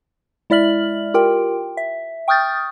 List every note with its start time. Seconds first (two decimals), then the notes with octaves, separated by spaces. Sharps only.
0.50 G#3 E4 D5 E5 F6 F#7
1.14 F4 G4 A#4 G5
1.77 E5
2.28 G5 C#6 D#6 F6 G6 A6